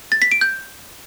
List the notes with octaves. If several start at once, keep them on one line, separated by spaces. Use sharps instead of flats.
A6
B6
D7
G6